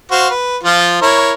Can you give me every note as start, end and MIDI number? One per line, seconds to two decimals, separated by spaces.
0.11 0.29 66
0.11 0.29 72
0.11 0.29 77
0.31 0.57 71
0.63 0.98 53
0.63 0.98 65
1.02 1.33 64
1.02 1.33 70
1.02 1.33 73